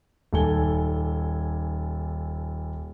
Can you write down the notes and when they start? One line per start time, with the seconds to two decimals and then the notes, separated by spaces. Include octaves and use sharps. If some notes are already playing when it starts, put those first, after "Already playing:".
0.33 D#1 A4 G#5 G7